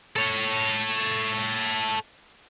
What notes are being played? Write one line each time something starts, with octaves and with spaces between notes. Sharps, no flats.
A4 C#5